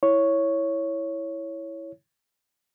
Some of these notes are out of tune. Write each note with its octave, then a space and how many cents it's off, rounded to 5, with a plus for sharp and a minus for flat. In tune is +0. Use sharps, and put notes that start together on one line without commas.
E4 +0 C#5 +0